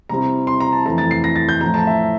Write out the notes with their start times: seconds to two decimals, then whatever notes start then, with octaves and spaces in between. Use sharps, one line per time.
0.09 C3 G3 C4 E4 A#5
0.47 C6
0.60 A#5
0.72 A5
0.85 F2 E3 A3 A#5
0.98 A6
1.11 C7
1.24 A#6
1.36 A6
1.49 G6
1.61 A2 F3 A3 A#5
1.74 A5
1.87 E5